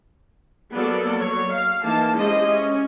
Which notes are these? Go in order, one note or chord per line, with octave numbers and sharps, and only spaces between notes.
F#3 A#3 B3 F#4 A4 D5
F#3 C#5
F5
E3 A#3 D#4 A5
G#3 C#4 E4 G4 C5 D#5
C#4